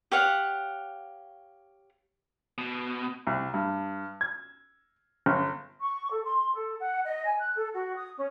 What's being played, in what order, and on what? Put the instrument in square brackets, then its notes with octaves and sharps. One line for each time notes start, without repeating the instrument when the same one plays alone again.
[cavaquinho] G4 C#5 F5 F#5
[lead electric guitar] B2
[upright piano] C2
G2
G#6
G1
[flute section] C#6
A4
C6
A4
F#5
D#5
G#5
F#6
A4
F#4
D#6
C#4